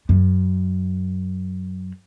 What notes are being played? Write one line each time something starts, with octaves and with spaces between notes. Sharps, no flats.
F#2